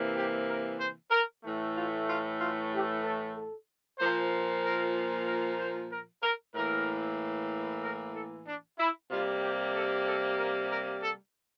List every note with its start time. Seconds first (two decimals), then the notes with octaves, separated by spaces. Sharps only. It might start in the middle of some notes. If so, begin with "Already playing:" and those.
Already playing: C3 E3 A#3
0.15 G4
0.48 A#4
0.79 C5
1.11 A#4
1.43 A2 E3 A3
1.76 F4
2.08 F4
2.40 F4
2.72 G4
3.03 A4
3.35 A4
3.99 A#2 F3 A#3 C5
4.64 A#4
5.26 A#4
5.59 C5
5.91 A#4
6.22 A#4
6.55 A2 E3 A#3 A#4
7.83 A#4
8.14 A4
8.47 D4
8.79 E4
9.10 C3 G3 A#3 F4
9.42 G4
9.75 A4
10.07 A4
10.38 A#4
10.70 A#4
11.02 A4